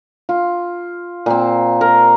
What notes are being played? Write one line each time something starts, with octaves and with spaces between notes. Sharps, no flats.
F4
A#2 C4
A#4